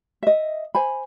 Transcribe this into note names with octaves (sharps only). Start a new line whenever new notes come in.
D#5 E5
C5 G#5 B5